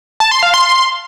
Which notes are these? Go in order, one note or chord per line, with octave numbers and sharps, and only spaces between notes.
A5
C6
F5
C6